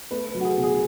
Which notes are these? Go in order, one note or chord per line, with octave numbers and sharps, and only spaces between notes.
A3 B4
B4
F#3
F#4
G#4
B2
G#4